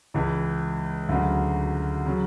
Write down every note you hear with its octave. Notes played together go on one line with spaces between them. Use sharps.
C#2 C#3 E3
D2 C#3 F#3
C#3 F#3